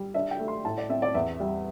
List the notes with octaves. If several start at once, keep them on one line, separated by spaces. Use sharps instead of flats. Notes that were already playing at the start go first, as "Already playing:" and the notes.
Already playing: G3
D4 E5
G5
A3
C6
A2 A5
D5
C4 E5
D5
E2 E5
G3